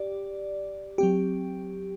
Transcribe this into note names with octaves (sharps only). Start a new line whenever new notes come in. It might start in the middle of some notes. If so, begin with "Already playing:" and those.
Already playing: G4 D5
F#3 C4 G4